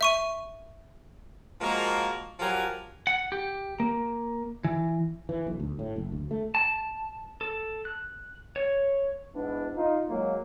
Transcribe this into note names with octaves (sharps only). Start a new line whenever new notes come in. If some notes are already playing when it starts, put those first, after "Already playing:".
E5 C#6 D#7
F3 G#3 A#3 F#4 A#4
F3 F#3 G4 A#4 F#5 G#5
F#5
G4
A#3
E3
E3
B1
D2
A2
F#1
D2
A3
A5
A4
F#6
C#5
G#2 B3 D4 E4
D#4 F4
F#3 G#3 A#3